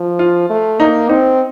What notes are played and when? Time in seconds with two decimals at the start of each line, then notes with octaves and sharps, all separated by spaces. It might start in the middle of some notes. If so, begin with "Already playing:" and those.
Already playing: F3
0.19 F4
0.50 A3
0.80 A#3 D#4
1.09 C4 D#4